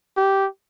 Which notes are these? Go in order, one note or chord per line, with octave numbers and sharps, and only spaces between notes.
G4